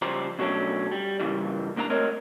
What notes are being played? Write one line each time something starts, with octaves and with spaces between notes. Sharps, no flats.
C#3 F3 G3 C5 D5 A#5
B2 F#3 A3 C#4 D4
G3
G2 A#2 C#3 E3 G3
C#2 A#3 D4 D#5 A#5
A3 C4 A#4 C#5 D#5